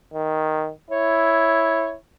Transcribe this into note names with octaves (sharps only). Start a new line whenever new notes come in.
D#3
E4 C#5